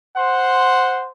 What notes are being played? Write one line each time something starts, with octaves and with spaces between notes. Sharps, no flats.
C5 F#5 C6